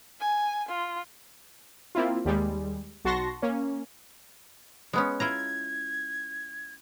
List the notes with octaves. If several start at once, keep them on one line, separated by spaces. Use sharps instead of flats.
G#5
F4
A#3 C4 E4 F4
D#2 G3 G#3
B1 F#4 A5 C6 C#6 A#6
A#3 C#4
G#3 B3 C#4
E4 F4 A#5 G#6